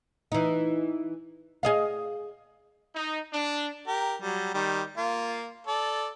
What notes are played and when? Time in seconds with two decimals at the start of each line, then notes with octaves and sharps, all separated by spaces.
0.32 E3 D#4
1.63 G#4 D#5 F5
2.95 D#4
3.33 D4
3.87 G4 A#4
4.22 F#3 G3
4.54 D#3 G3
4.97 A#3 F4
5.67 A4 D5